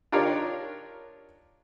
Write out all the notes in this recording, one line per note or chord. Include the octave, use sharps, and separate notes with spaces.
D4 D#4 F4 G4 A#4 C#5